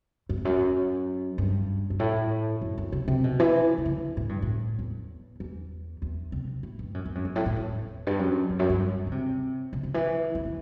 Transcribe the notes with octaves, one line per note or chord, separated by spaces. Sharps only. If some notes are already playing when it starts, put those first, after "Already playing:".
F#2
E2
F#2
G2
G2
A2
F#2
F#2
C3
C3
B2
E3
C3
D3
A2
G2
A2
E2
E2
E2
C3
A2
G2
F#2
G2
F#2
G2
A2
A2
E2
G2
F#2
E2
F#2
G2
D3
C3
C3
D3
E3
E3
D3